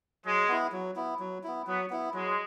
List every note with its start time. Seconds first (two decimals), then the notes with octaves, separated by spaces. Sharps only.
0.25 F#3 G#3
0.48 B3 E4
0.72 F#3
0.96 B3 E4
1.19 F#3
1.43 B3 E4
1.67 F#3 B3
1.90 B3 E4
2.14 F#3 G#3